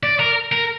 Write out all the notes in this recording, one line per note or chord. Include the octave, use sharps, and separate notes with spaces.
D5
A#4
A#4